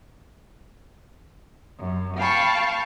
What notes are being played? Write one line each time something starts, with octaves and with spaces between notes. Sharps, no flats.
F#2
F5 G5 A5 B5 C#6